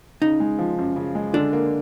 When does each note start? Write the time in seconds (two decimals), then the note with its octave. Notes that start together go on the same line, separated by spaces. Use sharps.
0.22 C#3 D#4
0.40 G#3
0.59 F3
0.78 F#2
0.96 C#3
1.15 G#3
1.33 D3 D4
1.53 A#3